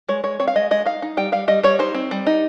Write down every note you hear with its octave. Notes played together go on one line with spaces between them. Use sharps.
G#3 C#5
G#3 C#5
C4 C#5
F5
G#3 D#5
G#3 D#5
D#4 F5
D#4
G3 G5
G3 F5
G3 D#5
G3 C#5
D#4 C5
C4
G3
D#4